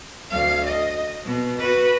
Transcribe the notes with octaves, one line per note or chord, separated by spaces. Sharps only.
D2 F5
D#5
B2
F#4 B4